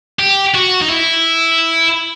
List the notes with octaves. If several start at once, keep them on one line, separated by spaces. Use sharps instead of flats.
G4
F#4
D#4
E4